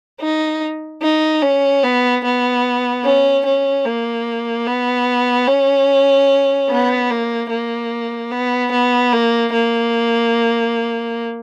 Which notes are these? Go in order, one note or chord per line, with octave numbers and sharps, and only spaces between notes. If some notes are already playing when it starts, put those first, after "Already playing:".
D#4
D#4
C#4
B3
B3
C#4
C#4
A#3
B3
C#4
B3
A#3
A#3
B3
B3
A#3
A#3